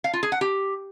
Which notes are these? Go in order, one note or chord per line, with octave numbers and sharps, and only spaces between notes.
F5
F4
G#4
F#5
G4